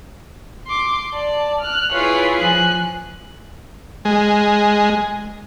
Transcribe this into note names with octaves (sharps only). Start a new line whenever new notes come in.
C6 D6
D5 A5
F6 F#6
E4 F4 G#4 B4 C#5
F3 G#5 F#6
G#3